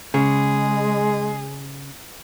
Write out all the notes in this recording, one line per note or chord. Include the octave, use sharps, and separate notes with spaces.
C#3 G#3 G#4